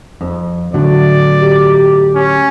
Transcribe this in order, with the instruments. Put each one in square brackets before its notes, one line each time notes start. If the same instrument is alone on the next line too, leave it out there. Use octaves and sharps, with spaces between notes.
[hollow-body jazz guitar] F2
[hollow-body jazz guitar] A2 D3 F#3 [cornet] D5
[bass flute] G4
[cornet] C#4